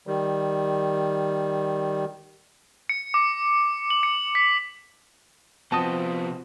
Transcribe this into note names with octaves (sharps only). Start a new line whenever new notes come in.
D#3 G3
C#7
D6
F#7
C#7
B6
C3 F3 B3 C4 F#4 D#5 A5 D#6